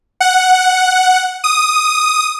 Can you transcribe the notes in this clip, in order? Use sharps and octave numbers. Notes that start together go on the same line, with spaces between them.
F#5
D#6